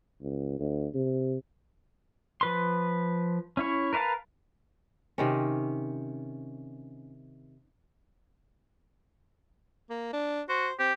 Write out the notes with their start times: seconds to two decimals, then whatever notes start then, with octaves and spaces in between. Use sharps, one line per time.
0.22 C#2
0.59 D2
0.94 C3
2.41 F3 B4 C6
3.57 C#4 E4 C#5
3.93 A#4 B4 C#5 F5 A5
5.18 C3 D#3 C#4
9.90 A#3
10.13 D4
10.49 F#4 C5
10.79 C4 G4